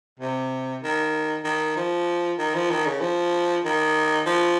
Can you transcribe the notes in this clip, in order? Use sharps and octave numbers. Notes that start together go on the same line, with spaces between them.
C3
D#3
D#3
F3
D#3
F3
D#3
C#3
F3
D#3
F3